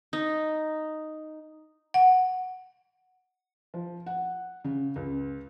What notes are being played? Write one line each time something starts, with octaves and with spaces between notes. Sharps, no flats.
D#4
F#5
F3
F#5
C#3
C#2